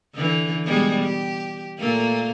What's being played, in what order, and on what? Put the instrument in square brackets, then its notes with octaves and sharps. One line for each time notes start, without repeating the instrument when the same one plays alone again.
[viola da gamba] D3 E3
B2 G3 G#3
G4
A#2 A3 A#3